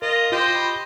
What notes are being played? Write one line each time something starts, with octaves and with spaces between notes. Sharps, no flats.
F4 A#4 D#5
F4 G4 C5 D#5
B5